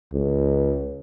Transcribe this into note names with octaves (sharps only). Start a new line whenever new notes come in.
C#2